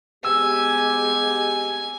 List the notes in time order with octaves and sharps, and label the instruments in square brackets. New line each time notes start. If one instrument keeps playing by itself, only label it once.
[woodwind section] G#3 B3 G4 [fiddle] G#5 [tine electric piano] E6